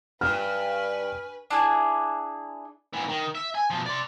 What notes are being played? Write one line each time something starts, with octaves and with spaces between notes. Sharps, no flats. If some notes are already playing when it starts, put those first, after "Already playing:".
G2 B4 G#5 F6
D4 E4 G#4
G#2 E3
D#3
E5
G#5
B2 F3
D5 C6